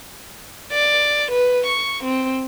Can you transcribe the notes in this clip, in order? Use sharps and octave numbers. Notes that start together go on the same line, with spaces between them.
D5
B4
C#6
C4